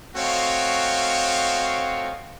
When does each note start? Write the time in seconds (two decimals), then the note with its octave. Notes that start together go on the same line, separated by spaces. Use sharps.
0.16 A3 C4 F#4 C#5 D#5 F5